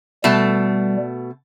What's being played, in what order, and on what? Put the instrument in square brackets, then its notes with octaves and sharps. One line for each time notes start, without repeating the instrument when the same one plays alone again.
[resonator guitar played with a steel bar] B2 A3 A5 [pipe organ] G3